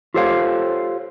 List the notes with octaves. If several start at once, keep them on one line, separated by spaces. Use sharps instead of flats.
F4 G4 A4 C5 C#5 F5